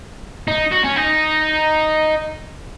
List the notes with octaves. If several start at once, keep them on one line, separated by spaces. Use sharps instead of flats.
D#4
F#4
C#4
D#4